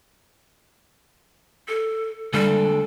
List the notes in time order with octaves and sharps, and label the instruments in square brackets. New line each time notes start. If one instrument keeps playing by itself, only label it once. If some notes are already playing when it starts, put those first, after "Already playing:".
[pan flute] A4
[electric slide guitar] D3 G#3 A4 [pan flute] G3